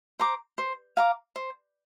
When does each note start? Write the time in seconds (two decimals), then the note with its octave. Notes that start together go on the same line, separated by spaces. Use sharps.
0.19 C5 A#5 D6
0.58 C5
0.97 F5 A#5 D6
1.36 C5